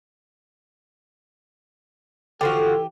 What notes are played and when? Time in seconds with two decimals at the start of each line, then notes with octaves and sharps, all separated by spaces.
2.41 D3 E3 F3 F#4 G4 A4